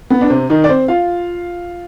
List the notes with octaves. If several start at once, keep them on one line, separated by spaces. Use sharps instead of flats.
B3
D4
C3 C4
D#3 D#4
D5
C4 C5
F4 F5